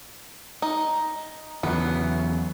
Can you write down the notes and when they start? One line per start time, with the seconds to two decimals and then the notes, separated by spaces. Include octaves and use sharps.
0.62 D#4
1.63 E2 C#3 F#3 B3